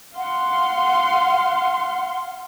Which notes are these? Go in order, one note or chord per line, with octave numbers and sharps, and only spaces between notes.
F5 F#5 C6